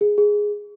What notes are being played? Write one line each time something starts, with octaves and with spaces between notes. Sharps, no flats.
G#4
G#4